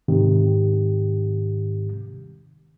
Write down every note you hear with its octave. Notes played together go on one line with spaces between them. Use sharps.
G#2 C3 D#3 G4